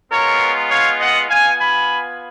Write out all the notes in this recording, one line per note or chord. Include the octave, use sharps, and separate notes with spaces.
G#3 B3 F4 A#4 C#5
C#5 F5
D#5 F#5
B3 F4 F5 G#5
G#5 B5